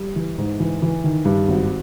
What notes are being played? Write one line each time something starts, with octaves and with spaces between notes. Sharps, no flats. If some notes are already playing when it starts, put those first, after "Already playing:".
Already playing: G3
E3
G#2
E3
E3
D#3
G2
G#1